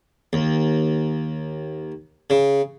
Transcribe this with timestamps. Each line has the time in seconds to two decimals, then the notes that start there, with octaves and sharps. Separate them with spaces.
0.33 D#2
2.30 C#3